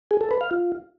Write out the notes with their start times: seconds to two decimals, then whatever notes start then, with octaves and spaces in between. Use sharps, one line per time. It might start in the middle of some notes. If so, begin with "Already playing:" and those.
0.11 G#4
0.21 A4
0.31 B4
0.41 F5
0.51 F4